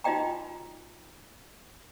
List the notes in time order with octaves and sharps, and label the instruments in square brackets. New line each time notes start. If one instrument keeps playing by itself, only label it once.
[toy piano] D#4 F4 F#4 D#5 G5 A#5